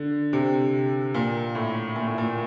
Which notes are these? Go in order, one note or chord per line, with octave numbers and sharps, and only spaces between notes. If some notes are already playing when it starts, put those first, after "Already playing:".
Already playing: D3
C3
A#2
A2
A#2
A2
A#2